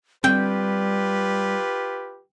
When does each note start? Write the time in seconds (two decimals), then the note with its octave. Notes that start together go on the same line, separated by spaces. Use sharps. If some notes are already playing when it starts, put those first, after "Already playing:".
0.24 G3 C4 F4 G4 B4 G5